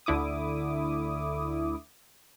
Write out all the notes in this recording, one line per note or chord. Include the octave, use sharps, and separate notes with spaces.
D2 D3 E4 D6 D#6